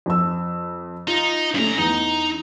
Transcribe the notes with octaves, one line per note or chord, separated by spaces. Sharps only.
F2 E6
D#4 F4
G2 A3 C#4 A#5
E2 D#4